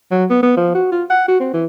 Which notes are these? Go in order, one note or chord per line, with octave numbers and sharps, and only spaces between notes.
F#3
B3
B3
F3
F#4
F4
F#5
F#4
C4
E3